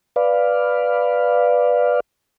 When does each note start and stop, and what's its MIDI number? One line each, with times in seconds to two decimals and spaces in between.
0.16 2.00 71
0.16 2.00 74
0.16 2.00 77